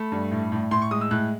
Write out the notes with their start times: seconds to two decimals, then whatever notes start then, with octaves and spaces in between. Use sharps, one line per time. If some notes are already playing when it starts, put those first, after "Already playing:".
Already playing: A3 B5
0.12 G2
0.31 A2
0.52 A2
0.71 A2 C6
0.82 C#6
0.91 G#3 D#6
1.01 E6
1.11 A2 F#6